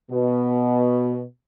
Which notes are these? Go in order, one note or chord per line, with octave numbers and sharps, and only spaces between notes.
B2